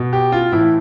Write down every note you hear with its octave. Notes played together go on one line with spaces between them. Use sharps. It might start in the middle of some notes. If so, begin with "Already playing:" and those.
Already playing: B2
G4
F4
A2 E3 E4